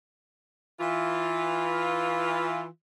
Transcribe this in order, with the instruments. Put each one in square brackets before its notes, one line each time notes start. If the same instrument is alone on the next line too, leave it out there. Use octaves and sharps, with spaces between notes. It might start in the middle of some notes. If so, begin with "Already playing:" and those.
[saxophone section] E3 F4